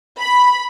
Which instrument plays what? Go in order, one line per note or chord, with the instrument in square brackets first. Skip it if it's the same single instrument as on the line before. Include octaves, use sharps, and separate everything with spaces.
[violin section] B5